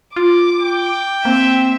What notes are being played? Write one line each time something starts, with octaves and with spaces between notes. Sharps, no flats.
F4 D6
G5
A#3 C4 E5